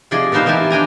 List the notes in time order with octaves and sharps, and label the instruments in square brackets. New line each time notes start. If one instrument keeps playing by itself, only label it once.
[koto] C3 F3 G#4 D5 D#5 G#5
A#2 F3 B3 D#4 C5 F5
E3 G4 E5 G#5 A5
D4 G5 G#5 A#5